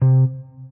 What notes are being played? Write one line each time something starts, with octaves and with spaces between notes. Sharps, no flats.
C3